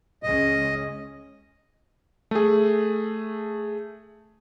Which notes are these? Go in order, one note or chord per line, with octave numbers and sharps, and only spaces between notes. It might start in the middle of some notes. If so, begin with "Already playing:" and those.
C#2 G#3 C#4 D#5
A3 G#4